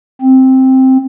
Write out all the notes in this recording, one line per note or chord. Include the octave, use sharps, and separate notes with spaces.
C4